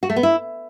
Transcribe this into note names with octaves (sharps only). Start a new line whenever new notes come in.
F#4
A3
B3
E4